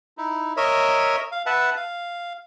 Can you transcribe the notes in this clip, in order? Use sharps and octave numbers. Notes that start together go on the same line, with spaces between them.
D#4 E4
A#4 C#5 D#5 E5
F5
B4 E5 F#5 A5
F5